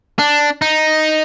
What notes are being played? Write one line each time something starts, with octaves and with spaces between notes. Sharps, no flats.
D4
D#4